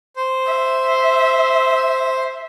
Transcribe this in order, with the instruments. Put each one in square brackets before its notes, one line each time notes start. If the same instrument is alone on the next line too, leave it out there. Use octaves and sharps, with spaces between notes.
[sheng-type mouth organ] C5
[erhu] E5